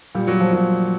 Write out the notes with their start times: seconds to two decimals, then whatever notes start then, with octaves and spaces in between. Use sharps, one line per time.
0.15 A#2 G3
0.27 F#3
0.40 F3
0.53 A#2 F#3